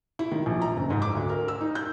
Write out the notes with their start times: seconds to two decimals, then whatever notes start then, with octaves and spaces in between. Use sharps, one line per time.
0.19 E4
0.32 D#3
0.46 A#1
0.62 A#5
0.77 F#1
0.90 G#2
1.02 D6
1.15 D2
1.29 A#4
1.48 E6
1.61 D#4
1.75 G6